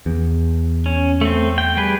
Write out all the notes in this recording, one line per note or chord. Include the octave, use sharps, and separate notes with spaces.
E2
C#4
A3 C4
G5
G3 G#4 B4